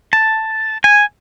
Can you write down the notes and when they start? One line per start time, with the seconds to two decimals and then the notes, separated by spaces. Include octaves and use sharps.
0.13 A5
0.84 G#5